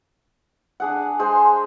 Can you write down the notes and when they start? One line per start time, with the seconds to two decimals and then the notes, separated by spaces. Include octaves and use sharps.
0.80 D4 G#4 F#5
1.19 G#3 G#4 C5